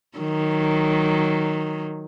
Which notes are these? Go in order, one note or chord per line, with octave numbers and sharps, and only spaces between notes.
D#3 F#3